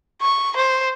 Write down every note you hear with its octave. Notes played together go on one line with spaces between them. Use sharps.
C#6
C5